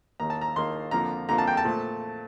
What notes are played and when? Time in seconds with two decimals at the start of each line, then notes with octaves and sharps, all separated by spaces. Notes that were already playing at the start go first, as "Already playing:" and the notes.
0.20 D#2 D#3 A#3 A#5
0.30 A5
0.41 A#5
0.56 D#2 D#3 A#3 C6
0.91 F2 D3 F3 A#3 A#5
1.29 F2 D3 F3 A#3 A#5
1.38 A5
1.47 G5
1.57 A5
1.65 A#2 A3 C4